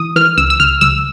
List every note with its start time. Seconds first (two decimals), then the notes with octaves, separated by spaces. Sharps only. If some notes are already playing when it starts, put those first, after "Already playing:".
Already playing: E3 D#6
0.16 E3 F6
0.37 C#2 E6
0.50 E6
0.60 C#2 F6
0.81 C#2 E6